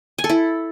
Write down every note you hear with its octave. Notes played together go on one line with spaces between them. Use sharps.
G#5
A4
E4